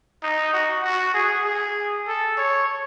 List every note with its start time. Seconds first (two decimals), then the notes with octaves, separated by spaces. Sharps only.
0.23 D#4
0.53 F#4
0.84 F#4
1.14 G#4
1.45 G#4
2.07 A4
2.37 C#5